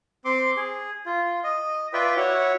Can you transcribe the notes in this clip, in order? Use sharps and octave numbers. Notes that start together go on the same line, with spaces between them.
C4 C6 D6
G#4
F4
D#5
F4 B4 D5 E5 G5
E4 F#4 C#5